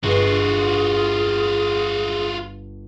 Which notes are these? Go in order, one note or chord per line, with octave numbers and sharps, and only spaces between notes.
G1 F4 F#4 G#4